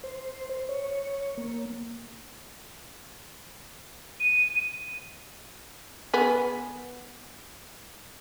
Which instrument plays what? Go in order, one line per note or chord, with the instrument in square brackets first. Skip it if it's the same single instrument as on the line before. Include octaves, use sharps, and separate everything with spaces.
[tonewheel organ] C5
C#5
A#3
[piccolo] D#7
[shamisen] B3 G#4